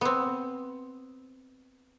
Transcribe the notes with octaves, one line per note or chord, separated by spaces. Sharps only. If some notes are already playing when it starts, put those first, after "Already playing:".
B3 C4